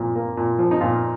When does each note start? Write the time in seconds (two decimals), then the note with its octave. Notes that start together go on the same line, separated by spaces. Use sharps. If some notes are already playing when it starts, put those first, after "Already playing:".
Already playing: A#2 F3
0.15 A#3
0.37 A#2
0.59 F3
0.71 D#4
0.80 A#2 F4